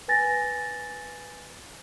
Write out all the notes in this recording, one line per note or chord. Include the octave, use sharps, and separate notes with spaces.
B4 G#5 A6 A#6